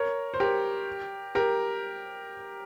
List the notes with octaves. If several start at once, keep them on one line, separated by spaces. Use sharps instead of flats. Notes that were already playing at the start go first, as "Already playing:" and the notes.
Already playing: A#4 C#5
C5
G4 A#4
G4 A#4